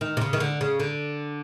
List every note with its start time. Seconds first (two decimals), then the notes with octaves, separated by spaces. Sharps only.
0.01 D#3
0.17 C3
0.21 C#3
0.33 D#3
0.40 D3
0.61 C#3
0.80 D3